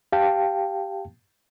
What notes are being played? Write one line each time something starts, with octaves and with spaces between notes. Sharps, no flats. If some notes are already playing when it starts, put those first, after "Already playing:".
G4 F5 G5 A5